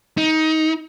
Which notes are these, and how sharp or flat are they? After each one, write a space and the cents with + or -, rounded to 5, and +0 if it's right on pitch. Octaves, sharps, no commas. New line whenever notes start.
D#4 +20